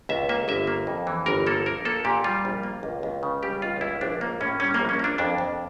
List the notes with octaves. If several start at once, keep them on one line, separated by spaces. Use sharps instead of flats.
C#2 E5
A#3 E5
G1 E5
A#3
F2
E3
G1 A#4
A#3 A4
A#1 A#4
A#3 A4
A#2 G4
G3 F4
A#1
A#3
C#2
C#2
C#3
G3 G4
C#2 F4
C#2 E4
A#1 D4
A#3
A2 C#4
G3 C#4
A#1 A#3
C#4
A#3 D4
F2 D4
F2